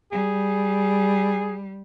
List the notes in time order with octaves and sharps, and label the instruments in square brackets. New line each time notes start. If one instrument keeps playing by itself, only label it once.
[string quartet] G3 [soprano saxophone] G#4